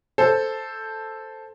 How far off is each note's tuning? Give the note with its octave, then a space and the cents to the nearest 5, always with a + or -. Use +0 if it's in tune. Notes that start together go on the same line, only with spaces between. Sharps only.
A4 +0 C5 +0